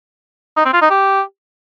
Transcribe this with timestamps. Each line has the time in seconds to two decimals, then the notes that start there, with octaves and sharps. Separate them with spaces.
0.57 D#4
0.65 C4
0.73 F4
0.82 D#4
0.90 G4